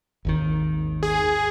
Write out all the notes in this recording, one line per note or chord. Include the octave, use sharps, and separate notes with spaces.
G#1 D#2 D#3
G#4